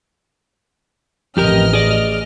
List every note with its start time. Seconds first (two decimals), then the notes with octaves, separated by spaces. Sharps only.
1.37 A1 F2 G4 A#4 D#5 F6
1.73 G#4 D5